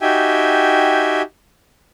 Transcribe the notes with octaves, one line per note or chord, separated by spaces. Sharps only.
D#4 F#4 G4 E5 G5 G#5